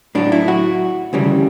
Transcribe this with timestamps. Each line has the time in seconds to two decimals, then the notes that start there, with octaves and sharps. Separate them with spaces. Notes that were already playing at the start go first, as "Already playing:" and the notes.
0.15 A2 F#3 D4
0.32 E4
0.48 F#4
1.13 D2 C#3 E3 G3